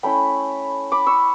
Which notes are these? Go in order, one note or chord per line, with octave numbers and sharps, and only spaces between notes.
A3 C#4 E4 G5 B5
B5 D6
C#6 E6